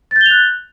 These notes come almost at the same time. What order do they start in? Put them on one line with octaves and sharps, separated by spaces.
A6 G6 G7 F7 F#6